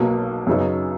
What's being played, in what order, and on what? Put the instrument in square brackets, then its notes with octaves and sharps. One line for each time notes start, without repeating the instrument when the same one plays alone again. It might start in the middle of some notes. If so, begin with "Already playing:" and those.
Already playing: [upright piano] B1 B2 F#3 A#3
F#2 C#3 F#3 B3 D#4